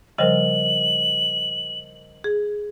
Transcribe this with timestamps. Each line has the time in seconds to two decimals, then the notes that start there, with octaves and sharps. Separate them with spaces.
0.18 C#3 F3 G3 A#4 C5 D#5 F#7
2.24 G#4